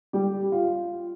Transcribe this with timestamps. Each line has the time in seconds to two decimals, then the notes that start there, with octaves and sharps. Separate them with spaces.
0.13 G3 G4
0.52 F4